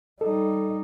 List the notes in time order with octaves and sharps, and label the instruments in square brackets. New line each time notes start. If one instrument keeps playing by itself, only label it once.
[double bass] G3 D#4 [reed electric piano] A4